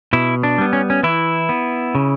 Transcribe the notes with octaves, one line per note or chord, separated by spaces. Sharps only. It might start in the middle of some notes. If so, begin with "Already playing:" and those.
B2 E4
D4
G3 B3
C#4
C#4
E3 E4
B3
C#3